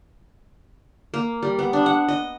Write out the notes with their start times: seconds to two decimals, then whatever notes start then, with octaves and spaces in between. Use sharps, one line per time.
1.14 A#3
1.43 G3
1.59 B3
1.73 D4
1.86 F#5
2.08 D#5